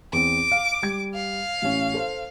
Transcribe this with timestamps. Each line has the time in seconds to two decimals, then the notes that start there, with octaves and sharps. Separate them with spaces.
0.13 E2 C4 D6
0.52 F5
0.83 G3 G#6
1.14 F5
1.62 A1 C#4
1.94 A4 C5